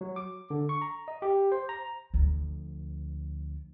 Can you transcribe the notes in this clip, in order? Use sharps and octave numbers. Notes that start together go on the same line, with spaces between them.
F#3
D6
D3
C#6
A#5
D#5
G4
C5
A#5
D2 F3